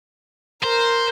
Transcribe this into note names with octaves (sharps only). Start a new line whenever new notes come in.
A#4 C5